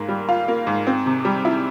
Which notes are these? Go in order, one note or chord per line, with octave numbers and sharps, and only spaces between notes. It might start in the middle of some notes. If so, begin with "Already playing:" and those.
Already playing: G#2 A#3
G3
F4
A#3
G#2
C4
C3
G3
E4